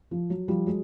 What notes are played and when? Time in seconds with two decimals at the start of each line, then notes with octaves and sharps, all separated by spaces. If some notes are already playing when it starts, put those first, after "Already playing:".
0.11 F3
0.30 F#3
0.48 F3 G3
0.66 F#3 G#3